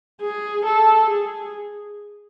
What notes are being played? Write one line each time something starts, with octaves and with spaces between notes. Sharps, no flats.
G#4
A4
G#4